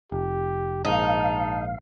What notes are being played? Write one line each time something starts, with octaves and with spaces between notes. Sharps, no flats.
F1 G4
A#1 G#2 D#4 F5 A5